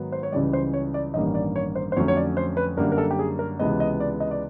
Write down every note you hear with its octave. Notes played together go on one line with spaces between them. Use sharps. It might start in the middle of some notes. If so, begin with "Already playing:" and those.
Already playing: G#2 D#3 F#3 B3
C5
C#5
C#2 C#3 E3 G3 D5
C5
C#5
D5
A1 G2 D#3 G3 A#3 D#5
D5
C#5
C5
C5
F2 D3 F#3 A3 C#4 C#5
C#5
D5
C5
B4
F#2 D3 G3 A#3 A#4
A#4
A4
G4
G#4
A#4
C#2 C3 E3 G#3 B3 D#5
D#5
D5
D#5
D5